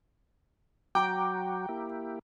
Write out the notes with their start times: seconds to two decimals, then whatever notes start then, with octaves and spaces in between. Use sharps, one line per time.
0.95 F#3 F#4 G5 A#5 D6
1.69 A#3 E4 G4